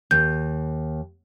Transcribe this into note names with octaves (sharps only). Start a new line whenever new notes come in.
D#2 G6